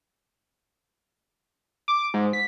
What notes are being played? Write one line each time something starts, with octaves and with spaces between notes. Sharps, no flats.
D6
G#2
B6